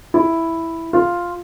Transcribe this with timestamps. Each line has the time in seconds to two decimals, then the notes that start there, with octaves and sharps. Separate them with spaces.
0.14 E4
0.93 F4